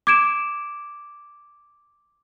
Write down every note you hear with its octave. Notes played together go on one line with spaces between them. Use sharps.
D6 G#6 D7 E7